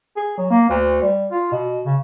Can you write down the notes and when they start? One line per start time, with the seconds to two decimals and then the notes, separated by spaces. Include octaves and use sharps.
0.17 G#4
0.38 F#3
0.50 A#3
0.69 D2
1.02 G3
1.31 F4
1.52 B2
1.86 C#3